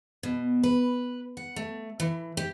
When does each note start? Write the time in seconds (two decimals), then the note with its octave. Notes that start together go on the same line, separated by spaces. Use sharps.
0.23 B2
0.63 B4
1.37 F#5
1.56 A3
2.00 E3
2.37 G4